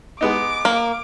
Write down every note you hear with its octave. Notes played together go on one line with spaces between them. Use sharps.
G#3 B3 D#4 D6
A#3